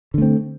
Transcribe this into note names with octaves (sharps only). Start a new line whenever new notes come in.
D3 A3 C4